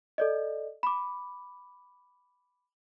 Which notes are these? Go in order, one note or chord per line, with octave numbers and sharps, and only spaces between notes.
A4 D5 D#5
B5 D6